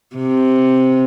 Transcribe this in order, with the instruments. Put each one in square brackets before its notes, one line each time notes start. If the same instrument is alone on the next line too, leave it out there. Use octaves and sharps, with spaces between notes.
[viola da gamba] C3